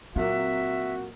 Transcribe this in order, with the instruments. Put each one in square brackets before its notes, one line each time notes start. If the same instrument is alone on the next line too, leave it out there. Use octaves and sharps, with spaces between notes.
[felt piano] A#2 F#3 A#3 [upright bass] C4 [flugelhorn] F#4 [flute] E5